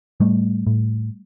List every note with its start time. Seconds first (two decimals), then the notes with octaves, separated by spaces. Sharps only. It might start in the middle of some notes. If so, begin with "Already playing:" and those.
0.20 A2 G3 A3
0.67 A2